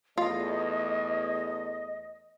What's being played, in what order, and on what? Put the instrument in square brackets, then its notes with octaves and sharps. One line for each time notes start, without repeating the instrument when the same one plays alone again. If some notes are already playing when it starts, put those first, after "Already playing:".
[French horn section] E2 A3 [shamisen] F4 [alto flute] D#5